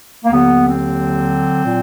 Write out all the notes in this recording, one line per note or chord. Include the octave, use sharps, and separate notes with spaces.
A#3
D#2 D3 F#3 B3
C4
A#2 F#3